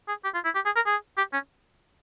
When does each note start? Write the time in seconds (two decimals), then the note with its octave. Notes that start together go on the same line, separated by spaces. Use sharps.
0.08 G#4
0.24 G4
0.34 F4
0.45 E4
0.55 G4
0.65 G#4
0.76 A#4
0.86 G#4
1.18 G4
1.33 C#4